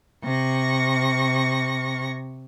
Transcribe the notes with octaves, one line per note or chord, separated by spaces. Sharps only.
C3 C#6 A#6